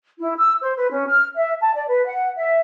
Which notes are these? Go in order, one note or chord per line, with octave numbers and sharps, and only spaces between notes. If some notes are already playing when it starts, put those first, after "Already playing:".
E4
E6
C5
B4
C#4
F6
E5
A5
D5
B4
F#5
E5